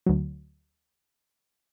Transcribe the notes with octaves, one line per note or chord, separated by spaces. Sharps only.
D2 F#3